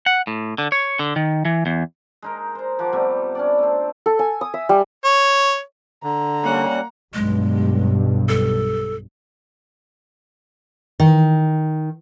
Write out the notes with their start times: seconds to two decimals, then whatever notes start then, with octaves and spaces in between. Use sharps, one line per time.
0.06 F#5
0.27 A2
0.58 D3
0.72 C#5
0.99 D3
1.16 D#3
1.45 E3
1.66 E2
2.22 G#3 D#4 A#4
2.55 C5 A#5
2.79 F3 G4 F#5 D6
2.93 C3 G3 A3 B3
3.35 C#4 D4 D5
3.58 A3 C4
4.06 A4
4.19 G#5
4.41 D#6
4.54 E5
4.69 G3
5.04 C#5
6.03 D3 A#5
6.43 G3 A#3 C#4 F#5
7.14 B1 G2 G#3
8.29 A4
11.00 D#3